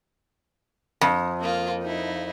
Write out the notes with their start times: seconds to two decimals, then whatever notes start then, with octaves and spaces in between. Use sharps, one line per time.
1.01 F2
1.41 A#3 F4
1.83 D#4 E4